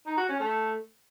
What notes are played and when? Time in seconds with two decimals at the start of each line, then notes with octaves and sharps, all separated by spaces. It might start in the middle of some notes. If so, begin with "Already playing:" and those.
0.06 D#4
0.17 F#4
0.29 C#4
0.40 A3